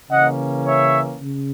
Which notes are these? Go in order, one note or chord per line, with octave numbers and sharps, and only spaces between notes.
C#3 E3 A#3 C#4 D#5 F#5
C#5 E5
C#3